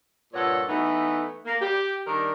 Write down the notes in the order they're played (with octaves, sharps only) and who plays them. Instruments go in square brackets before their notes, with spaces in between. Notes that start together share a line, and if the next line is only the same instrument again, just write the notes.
[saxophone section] G2 A#2 A4 C#5 F#5
E3 A3 B3 D#4 F#5
A#3
G4
D#3 G3 D4 A#4